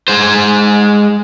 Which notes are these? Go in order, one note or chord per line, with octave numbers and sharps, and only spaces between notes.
G#3 C5